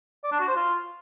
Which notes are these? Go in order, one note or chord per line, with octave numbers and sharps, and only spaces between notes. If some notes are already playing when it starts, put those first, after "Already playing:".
D5
D4
F#4
C5
F4